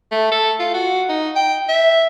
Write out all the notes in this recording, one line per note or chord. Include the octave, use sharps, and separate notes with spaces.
A3
A4
F4
F#4
D#4
G5
E5